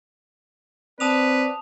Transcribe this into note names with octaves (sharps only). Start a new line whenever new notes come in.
C4 B4 D5 A5 D#6 F7